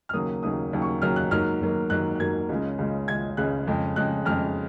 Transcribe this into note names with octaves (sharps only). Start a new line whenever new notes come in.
F6
D#2 C#3 F#3 A#3 D#6
D#2 C#3 F#3 A#3 D#6
D#2 C#3 F#3 A#3
C#6
D#2 C#3 F#3 A#3 F6
F#6
G#2 F#3 A#3 F6
G#2 F#3 A#3
G#2 F#3 A#3 F#6
F#6
G#2 F#3 A#3 G#6
C#2 C#3 G#3
C#2 C#3 G#3
C#2 C#3 G#3 G#6
C#2 C#3 G#3 F#6
F2 C#3 G#3
F2 C#3 G#3 F#6
F2 C#3 G#3 F6